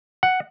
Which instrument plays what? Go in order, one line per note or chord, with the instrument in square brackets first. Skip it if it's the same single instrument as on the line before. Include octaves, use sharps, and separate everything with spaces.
[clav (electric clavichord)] F#5